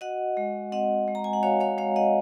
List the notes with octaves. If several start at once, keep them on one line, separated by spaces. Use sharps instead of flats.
F#4 D#5 F#5
G#3
C4 D#5 F#5
G#3
A#5
G#5
F#5
F#4 C#5 F5
C#5 F5
G#3 C#5 F5
D#5 F#5